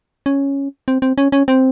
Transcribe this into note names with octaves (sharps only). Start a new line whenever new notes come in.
C#4
C4
C4
C#4
C#4
C4